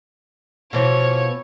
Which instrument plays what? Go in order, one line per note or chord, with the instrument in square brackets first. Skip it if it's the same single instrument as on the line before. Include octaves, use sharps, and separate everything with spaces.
[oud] B2 E3 F3 [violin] C#5